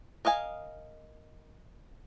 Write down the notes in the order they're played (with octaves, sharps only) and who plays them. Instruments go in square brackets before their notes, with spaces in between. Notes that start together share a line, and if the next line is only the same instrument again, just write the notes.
[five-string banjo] A#4 D#5 F5 G#5